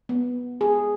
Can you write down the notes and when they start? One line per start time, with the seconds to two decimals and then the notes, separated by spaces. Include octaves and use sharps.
0.09 B3
0.61 G#4